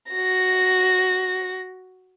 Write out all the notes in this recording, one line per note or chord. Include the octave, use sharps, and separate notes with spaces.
F#4 A#6